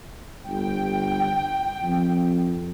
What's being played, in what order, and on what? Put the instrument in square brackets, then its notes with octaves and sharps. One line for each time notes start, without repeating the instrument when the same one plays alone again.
[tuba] G1 [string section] G5
[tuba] F2